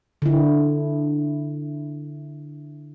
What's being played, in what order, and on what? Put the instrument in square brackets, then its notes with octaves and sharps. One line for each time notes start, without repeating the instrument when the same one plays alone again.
[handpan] D3 E4